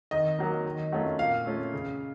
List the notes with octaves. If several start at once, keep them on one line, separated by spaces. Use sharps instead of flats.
D#3 D#5
F#3 A#3
D#3
F#3 A3 C#4 F4
A#2 F5
A3 C#4 F4
C#3